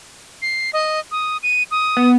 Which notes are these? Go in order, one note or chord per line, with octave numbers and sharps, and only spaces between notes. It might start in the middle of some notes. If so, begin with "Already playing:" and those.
C7
D#5
D#6
D#7
D#6
B3